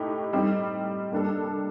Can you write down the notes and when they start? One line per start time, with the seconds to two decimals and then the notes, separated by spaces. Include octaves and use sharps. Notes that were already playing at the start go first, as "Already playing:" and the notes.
Already playing: A2 A3 D#4 G4
0.33 G3 C4 D#4
1.12 G3 A#3 D4 A4